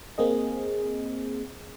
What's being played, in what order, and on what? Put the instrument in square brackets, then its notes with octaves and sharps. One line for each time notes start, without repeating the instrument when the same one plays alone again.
[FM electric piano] A#3 C4 G#4 D#5